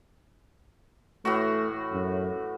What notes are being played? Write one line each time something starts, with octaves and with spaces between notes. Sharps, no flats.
A2 E3 A3 F#4
F#2